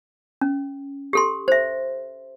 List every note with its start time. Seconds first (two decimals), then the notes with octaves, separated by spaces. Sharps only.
0.41 C#4
1.13 G4 A4 C6
1.48 C5 E5